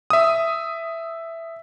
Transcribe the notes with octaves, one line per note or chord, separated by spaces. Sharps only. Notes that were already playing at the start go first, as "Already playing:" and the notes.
E5 D#6